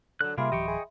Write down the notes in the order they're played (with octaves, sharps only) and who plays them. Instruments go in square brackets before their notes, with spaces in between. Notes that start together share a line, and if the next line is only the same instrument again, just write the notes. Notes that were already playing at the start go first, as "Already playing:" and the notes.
[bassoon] D3 [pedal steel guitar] F#3 F#6
[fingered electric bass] C3 [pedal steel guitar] G3 A#3 G#4 [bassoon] F4 [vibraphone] E5 B5 C6
[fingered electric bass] D1 E3 F#3 [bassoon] G4 [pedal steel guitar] D#5 G5 C#6
[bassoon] G#4